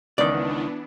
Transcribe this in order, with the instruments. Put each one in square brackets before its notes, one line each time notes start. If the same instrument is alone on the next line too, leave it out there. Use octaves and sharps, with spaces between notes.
[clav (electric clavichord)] C#2 D#3 [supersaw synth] E3 B3 D4 [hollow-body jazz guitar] D5